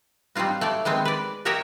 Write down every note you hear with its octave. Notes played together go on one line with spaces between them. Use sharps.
G3 C4 D#4 F4 F#4
A3 C#5 D5
D#3 G#3 B3 C4
B4 D5
F#4 G4 A#4 C#5 D#5 E5